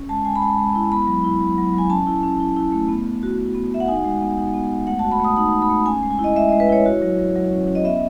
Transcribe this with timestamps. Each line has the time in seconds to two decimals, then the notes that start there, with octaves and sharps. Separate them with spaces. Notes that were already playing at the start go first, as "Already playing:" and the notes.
Already playing: C#4
0.09 G#3 A5
0.25 G#3 G#5
0.35 B5
0.41 G#3 A5
0.58 G#3
0.75 E4
0.91 B3 B5
1.07 F#3
1.24 E4
1.41 F#3
1.58 F#3
1.73 F#3 G#5
1.90 C#4 A5
2.07 E4
2.23 C#4
2.40 E4
2.56 E4
2.72 A3
2.89 B3
3.06 B3
3.23 F#4
3.38 F#4
3.55 B3
3.72 F#4 E5
3.80 F#5
3.88 D#4 G#5
4.04 G#3
4.21 B3
4.37 D#4
4.54 B3
4.70 G#3
4.87 A3 F#5
4.99 A5
5.04 F#4
5.11 B5
5.20 A3 D#6
5.37 D#4 D#6
5.53 D#4
5.62 B5
5.70 A3
5.86 C#4 G#5
6.03 G#3
6.11 G#5
6.19 E4
6.24 D#5
6.36 G#3 E5
6.49 D#5
6.52 G#3
6.60 B4
6.69 E4 C#5
6.86 F#4
7.02 F#3
7.19 F#3
7.35 F#3
7.51 C#4
7.67 C#4
7.75 D#5
7.84 B3 E5